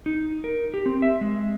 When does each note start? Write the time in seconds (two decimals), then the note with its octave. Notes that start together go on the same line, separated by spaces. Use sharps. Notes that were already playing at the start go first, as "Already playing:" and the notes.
0.06 D#4
0.44 A#4
0.74 G4
0.86 C4
1.02 E5
1.21 G#3